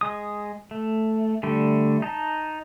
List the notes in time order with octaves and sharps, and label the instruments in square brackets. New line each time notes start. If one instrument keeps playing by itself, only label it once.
[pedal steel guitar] G#3 D#6
A3
D3 G3 A3
D#4 A5 A#5